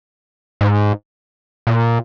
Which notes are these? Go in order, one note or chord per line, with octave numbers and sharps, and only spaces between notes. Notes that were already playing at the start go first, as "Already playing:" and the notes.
G#2
A#2